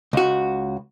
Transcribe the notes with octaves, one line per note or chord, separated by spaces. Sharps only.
C#2 F#4